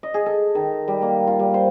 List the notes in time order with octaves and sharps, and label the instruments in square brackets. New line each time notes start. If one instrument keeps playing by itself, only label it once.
[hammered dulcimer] D#5
G#4
A4
D#3
G3
A#3
F4
G3
C5